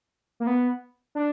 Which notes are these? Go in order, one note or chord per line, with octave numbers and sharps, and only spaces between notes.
A#3
B3
D4